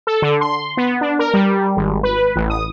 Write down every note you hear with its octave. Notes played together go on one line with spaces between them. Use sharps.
A4
D3
C6
B3
D4
A#4
G3
G#1
B4
A1
D#6